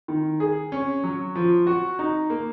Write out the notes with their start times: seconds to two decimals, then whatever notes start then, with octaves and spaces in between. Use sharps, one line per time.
0.08 D#3
0.40 G#4
0.72 C#4
1.04 F#3
1.36 F3
1.67 F#4
1.99 D#4
2.30 A#3